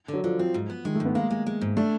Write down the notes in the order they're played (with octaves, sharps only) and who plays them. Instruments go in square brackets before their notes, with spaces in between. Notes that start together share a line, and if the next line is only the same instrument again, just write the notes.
[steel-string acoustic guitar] D3
[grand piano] F#3
[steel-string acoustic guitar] D3 [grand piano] F3
[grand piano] F3 [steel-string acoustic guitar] C4
[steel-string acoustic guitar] G#2
B3
[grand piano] D#3 [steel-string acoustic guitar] G#3
[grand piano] A3
[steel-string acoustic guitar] G#2
[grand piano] B3
[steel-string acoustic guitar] G#3 [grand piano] A#3
[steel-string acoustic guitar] G#3
G#3
G#2
[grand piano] A3 [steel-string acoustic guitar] D4